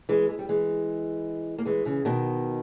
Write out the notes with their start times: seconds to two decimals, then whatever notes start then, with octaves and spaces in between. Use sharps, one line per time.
0.09 E3 G#3
0.29 G#3
0.39 G3
0.49 E3 G#3
1.58 A#3
1.65 E3 G#3
1.85 C#3 E3
2.05 B2 D#3